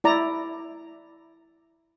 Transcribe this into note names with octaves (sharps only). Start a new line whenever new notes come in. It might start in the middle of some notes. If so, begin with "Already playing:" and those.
E4 D5 A#5